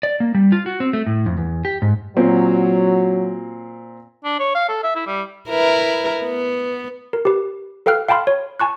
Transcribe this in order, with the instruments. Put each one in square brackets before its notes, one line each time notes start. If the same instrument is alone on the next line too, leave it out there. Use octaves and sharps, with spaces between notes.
[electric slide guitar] D5
A#3
G3
F4
F#4
C4
A3
A2
F2
E2
G4
G#2
[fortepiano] A#2 C4 [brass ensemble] F#3
[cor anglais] D4
C#5
F5
A4
E5
E4
G3
[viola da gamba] E4 A#4 B4
B3
[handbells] A#4
G4 B4
A4 B4 F5 G5 F6 F#6
F5 G5 A5 B5 C6 F6
C#5
G#5 A5 C#6 F#6